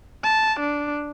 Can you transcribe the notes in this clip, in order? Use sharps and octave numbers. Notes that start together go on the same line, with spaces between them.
A5
D4